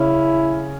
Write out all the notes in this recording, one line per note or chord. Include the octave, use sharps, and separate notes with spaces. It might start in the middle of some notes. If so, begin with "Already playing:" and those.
Already playing: C#3 C#4 E4